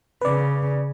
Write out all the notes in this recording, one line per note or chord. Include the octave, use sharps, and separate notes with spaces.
C#3 B4 D5